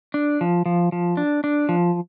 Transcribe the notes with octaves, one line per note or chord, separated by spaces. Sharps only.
D4
F3
F3
F3
D4
D4
F3